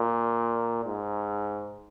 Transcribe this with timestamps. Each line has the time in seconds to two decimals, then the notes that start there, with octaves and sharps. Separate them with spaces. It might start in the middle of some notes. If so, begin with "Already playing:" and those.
Already playing: A#2
0.85 G#2